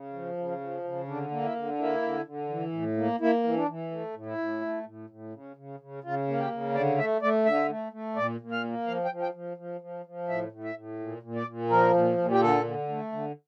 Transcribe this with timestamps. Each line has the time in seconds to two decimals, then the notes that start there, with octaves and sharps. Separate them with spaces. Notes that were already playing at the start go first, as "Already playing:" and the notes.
Already playing: C#3
0.13 F3
0.37 C#3
0.61 F3
0.84 C#3
1.08 D3 D4
1.31 A#3
1.43 E4
1.55 D3
1.78 A#3 E4
2.02 D3
2.25 D3
2.49 E3
2.73 A2
2.97 A#3
3.20 A#3 E4
3.44 E3
3.56 D4
3.68 E3
3.91 A3
4.14 A2
4.26 E4
4.38 A2
4.61 A3
4.85 A2
5.10 A2
5.33 C#3
5.56 C#3
5.80 C#3
6.04 C#3 F4
6.28 A#3
6.38 G4
6.51 C#3
6.74 D3 D5
6.98 A3 E5
7.22 A3 D5
7.45 D3 E5
7.68 A3
7.92 A3
8.16 A#2 D5
8.40 A#2
8.52 F5
8.64 A#3
8.87 F3 F5
9.05 G5
9.11 F3
9.22 G5
9.34 F3
9.57 F3
9.81 F3
10.06 F3
10.29 A2 E5
10.52 A2
10.64 E5
10.75 A2
10.99 A#2
11.22 A#2
11.35 D5
11.47 A#2
11.70 F3 A#4
11.94 A#2
12.18 A#2
12.31 G4
12.41 D3 A4
12.64 D3
12.89 A3
13.12 D3